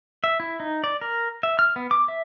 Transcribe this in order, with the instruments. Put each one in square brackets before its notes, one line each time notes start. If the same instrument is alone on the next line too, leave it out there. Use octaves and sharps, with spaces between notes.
[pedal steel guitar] E5
E4
D#4
D5
A#4
E5
F6
B3
D6
E5